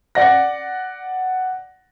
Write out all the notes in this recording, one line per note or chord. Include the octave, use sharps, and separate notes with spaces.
D5 F#5 A#6